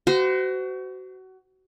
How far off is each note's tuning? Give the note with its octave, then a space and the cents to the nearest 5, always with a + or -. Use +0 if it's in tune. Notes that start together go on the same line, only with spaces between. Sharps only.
F#4 +25 C5 -35